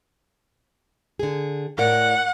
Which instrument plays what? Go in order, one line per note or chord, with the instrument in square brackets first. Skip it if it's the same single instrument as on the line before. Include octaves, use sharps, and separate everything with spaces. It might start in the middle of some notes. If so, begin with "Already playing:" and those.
[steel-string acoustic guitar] D3 G#4
[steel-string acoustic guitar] A2 A#4 D5 [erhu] F#5